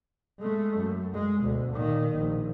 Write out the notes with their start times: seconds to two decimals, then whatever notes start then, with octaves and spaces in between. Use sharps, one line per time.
0.40 G#3 A3
0.78 F#2
1.14 G#3
1.43 D2 B2
1.73 A#2 D#3
2.17 A#1